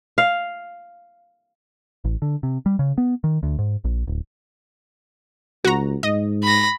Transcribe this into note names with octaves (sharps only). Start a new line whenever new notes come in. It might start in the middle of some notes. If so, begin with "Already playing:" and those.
F5
A1
D3
C3
G3
C#3
B3
D#3
D2
G#2
A#1
D1
C#2 F#4 A#5
G#2 D#5
B5 A#6